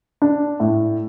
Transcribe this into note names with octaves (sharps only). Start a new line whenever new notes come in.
D4
A2